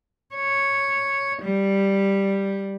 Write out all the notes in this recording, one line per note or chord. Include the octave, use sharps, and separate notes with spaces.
C#5
G3